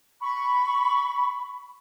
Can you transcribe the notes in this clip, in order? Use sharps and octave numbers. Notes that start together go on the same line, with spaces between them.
B5 C#6